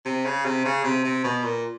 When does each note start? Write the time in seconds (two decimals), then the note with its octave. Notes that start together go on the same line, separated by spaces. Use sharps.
0.05 C3
0.25 C#3
0.45 C3
0.65 C#3
0.84 C3
1.04 C3
1.24 B2
1.44 A#2